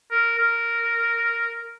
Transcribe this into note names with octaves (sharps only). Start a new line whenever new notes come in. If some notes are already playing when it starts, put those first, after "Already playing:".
A#4
A#4